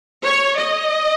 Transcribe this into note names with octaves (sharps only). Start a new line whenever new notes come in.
C#5
D#5